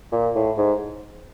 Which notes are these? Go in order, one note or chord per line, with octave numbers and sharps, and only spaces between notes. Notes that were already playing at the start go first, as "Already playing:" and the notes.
A#2
A2
G#2